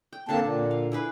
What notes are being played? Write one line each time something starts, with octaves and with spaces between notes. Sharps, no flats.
G5
D3 A#3 C4 D4 A4 A5
A#2
F5
E4 G#4 B4